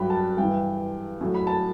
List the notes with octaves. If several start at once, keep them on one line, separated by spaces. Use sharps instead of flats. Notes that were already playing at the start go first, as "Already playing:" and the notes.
Already playing: G2 F#3 G5 B5
A5
G2 E3 G5
A2 F#3
B5
A5